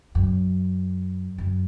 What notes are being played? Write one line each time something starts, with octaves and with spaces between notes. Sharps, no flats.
F#2
F#2